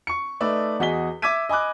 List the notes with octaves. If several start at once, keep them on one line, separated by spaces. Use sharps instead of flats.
C#6 C#7
A3 D#4 B4 D5 E5
E2 F#4 G#4 D#5 B6 G7
E5 D6 E6 G#6 B6 D#7
D#5 G#5 B5 D6 F#6